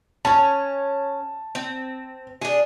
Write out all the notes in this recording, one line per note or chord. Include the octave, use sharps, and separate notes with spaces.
C#4 C#5 A5
C4
D4 G#4